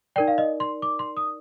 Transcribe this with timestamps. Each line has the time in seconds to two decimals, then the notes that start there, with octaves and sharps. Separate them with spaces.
0.16 D#4 A#4 D5 G5
0.28 F5
0.38 D#5
0.60 C6
0.82 D6
0.99 C6
1.17 D#6